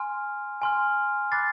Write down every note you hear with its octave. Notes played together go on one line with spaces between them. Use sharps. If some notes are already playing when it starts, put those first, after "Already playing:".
Already playing: G#5 C6 F6
G#5 C6 F6
B5 D6 F#6 A6 C7